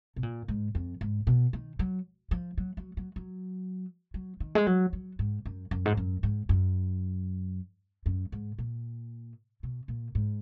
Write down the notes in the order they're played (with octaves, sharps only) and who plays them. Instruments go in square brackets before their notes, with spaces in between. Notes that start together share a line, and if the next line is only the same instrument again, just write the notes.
[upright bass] B2
A#2
G#2
F2
G#2
B2
D#3
F#3
F3
F#3
F#3
F#3
F#3
F#3
D#3
G#3
F#3
F#3
G#2
F#2
F#2
G#2
F#2
G#2
F#2
F#2
G#2
A#2
B2
A#2
G#2